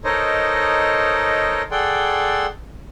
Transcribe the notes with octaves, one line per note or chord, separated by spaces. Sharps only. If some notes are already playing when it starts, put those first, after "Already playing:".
D#4 A4 A#4 C5 C#5 D#5
G#4 A4 D5 F#5 G5 C6